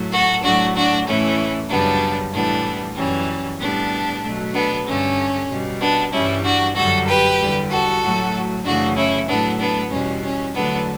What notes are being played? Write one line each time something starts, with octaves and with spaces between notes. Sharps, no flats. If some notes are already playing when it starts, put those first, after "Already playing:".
Already playing: A2 F#3 A3
F#4 A4
A2 F#3 A3 D4 F#4
D4 F#4
A2 E3 A3 C#4 E4
F#2 C#3 G3 B3 D4
A2 E3 G3 B3 D4
F#2 E3 G3 C#4
A2 G3 B3 D4
B2 F#3 A3
B3 D4
G2 D3 A3 C#4
B2 G3
B3 D4
G2 E3 G3 C#4 E4
D4 F#4
F#2 D3 G3 F#4 A4
G4 B4
E2 D3 G3
F#4 A4
A2 F#3 A3
F#2 C#3 E3 A3 D4 F#4
C#4 E4
A2 F#3 A3 B3 D4
B3 D4
E2 B2 G3 C#4
C#4
E2 D3 F#3 A3 B3 D4